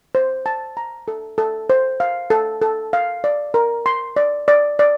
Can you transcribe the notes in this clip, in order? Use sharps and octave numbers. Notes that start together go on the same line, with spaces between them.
C5
A5
A#5
A4
A4
C5
F5
A4
A4
F5
D5
A#4
C6
D5
D5
D5